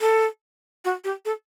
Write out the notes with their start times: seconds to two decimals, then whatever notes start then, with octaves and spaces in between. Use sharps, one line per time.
0.01 A4
0.85 F#4
1.04 G4
1.25 A4